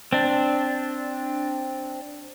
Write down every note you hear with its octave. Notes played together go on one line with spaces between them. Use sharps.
C4 D4